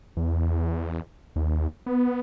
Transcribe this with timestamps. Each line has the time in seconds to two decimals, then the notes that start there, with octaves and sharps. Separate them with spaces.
0.17 E2
1.36 D#2
1.86 B3